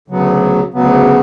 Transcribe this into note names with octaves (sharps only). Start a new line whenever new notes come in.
D2 C#3 F#3 B3
D2 C#3 F#3 B3